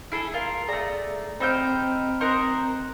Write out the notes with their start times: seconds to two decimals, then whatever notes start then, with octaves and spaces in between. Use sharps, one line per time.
0.12 E4 G#4 A4
0.34 F4 A#4
0.69 A3 G#4 D5 A#5
1.40 C4 D#4 C5 G5 B5 E6 F6
2.21 D#4 A#4 C5 C6 F#6